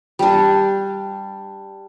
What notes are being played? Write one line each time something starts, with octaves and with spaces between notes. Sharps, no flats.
G3 D4